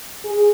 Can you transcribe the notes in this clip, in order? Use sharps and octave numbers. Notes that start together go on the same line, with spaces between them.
G#4